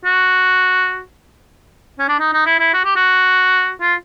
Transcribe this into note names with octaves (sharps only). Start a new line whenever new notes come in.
F#4
C#4
D4
D#4
D#4
E4
E4
F#4
G4
F#4
F4